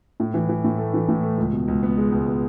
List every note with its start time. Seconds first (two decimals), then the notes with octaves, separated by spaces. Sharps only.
0.20 A2
0.34 E3
0.49 E3
0.64 A2
0.78 A3
0.94 E3
1.09 A2
1.23 A3
1.38 C#2
1.53 B2
1.68 C#2
1.83 B3
1.97 G#3
2.12 C#2
2.27 B3